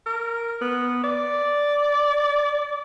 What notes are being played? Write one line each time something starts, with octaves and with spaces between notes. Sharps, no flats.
A#4
B3
D5